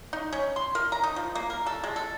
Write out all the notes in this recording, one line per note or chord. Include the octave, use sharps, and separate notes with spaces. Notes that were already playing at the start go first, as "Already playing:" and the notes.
D#4
C#4
C6
A#4
A#5
D#4
F3
A#3
A#4
A4
G#3
A4